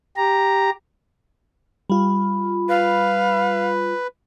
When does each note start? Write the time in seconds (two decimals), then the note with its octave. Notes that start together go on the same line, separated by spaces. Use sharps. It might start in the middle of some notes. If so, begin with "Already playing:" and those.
0.17 G4 A#5
1.90 G3 F4 B5
2.69 B4 F5